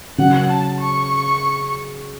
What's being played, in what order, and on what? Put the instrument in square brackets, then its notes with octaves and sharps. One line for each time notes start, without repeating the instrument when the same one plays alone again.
[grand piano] C#3 F#3 C#4 [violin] F#5
[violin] A5
C#6